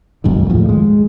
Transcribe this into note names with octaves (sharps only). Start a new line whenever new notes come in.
F#1 B1 F2 G#2
D#2 A2 F3
G#3